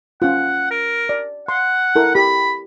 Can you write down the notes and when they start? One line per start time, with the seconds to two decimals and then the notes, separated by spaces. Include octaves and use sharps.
0.22 C#4 F4 F#5
0.71 A#4
1.09 D5
1.48 F#5 C6
1.96 E4 A4 A#4
2.15 G4 B5